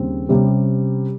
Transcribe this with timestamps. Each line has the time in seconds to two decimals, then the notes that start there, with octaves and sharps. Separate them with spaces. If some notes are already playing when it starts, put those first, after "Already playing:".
Already playing: D#2 C#3 G3 C4
0.29 C3 G3 C#4